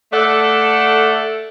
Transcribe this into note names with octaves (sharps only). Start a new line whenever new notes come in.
A3 A4 D5 F#5